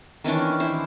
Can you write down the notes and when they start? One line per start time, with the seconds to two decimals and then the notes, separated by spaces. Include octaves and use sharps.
0.24 D#3 E3 C#4 D4
0.60 E4 C5